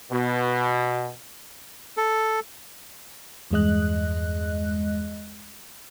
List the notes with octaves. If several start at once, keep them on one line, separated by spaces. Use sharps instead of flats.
B2
A4
E2 G2 G#3 D#5 F#6